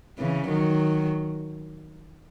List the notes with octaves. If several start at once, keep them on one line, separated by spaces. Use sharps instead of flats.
C#3 E3
D#3 F#3